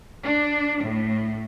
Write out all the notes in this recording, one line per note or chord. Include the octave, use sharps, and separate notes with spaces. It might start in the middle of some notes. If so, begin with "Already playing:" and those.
D4
A2